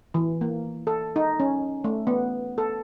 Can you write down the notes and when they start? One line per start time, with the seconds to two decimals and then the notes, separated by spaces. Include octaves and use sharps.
0.14 E3
0.41 A#3
0.87 A4
1.16 D#4
1.40 C#4
1.84 A3
2.07 B3
2.58 A4